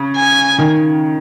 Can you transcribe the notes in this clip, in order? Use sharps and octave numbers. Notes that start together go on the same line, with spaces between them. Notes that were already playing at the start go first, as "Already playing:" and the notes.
Already playing: C#3
G#5
D#3